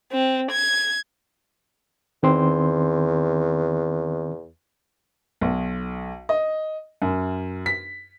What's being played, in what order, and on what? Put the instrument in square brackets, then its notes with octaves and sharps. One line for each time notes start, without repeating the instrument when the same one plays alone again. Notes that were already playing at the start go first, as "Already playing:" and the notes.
[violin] C4
G#6
[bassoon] E2 [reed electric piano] D#3 C4 C6
[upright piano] B1
D#5
F#2
B6